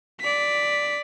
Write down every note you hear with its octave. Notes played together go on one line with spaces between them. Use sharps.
D5 B6